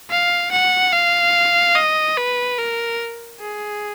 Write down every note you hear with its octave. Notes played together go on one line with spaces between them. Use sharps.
F5
F#5
F5
D#5
B4
A#4
G#4